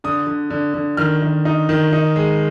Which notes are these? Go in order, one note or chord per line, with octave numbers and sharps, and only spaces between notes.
D3 D#6
D3
D3
D3
D#3 F6
D#3
D#4
D#3
D#4
G#3